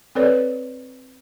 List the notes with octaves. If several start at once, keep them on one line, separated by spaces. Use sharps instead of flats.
C4 A4 B4 C#5 D5